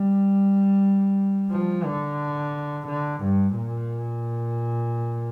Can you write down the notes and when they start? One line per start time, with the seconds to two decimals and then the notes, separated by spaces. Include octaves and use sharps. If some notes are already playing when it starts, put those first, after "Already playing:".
Already playing: G3
1.51 F3
1.85 D3
2.88 D3
3.22 G2
3.56 A#2